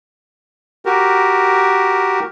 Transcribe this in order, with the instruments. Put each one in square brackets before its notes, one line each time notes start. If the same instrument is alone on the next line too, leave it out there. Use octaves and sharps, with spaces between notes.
[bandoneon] F#4 G4 A#4